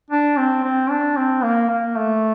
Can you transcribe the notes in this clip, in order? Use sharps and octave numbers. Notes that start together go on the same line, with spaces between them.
D4
C4
C4
D4
C4
A#3
A#3
A3